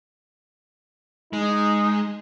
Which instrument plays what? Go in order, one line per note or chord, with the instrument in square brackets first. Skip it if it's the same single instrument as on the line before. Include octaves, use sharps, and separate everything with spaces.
[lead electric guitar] G#3 [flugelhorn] D#4